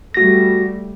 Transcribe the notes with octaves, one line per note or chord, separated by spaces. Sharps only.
G3 A3 F#4 A#6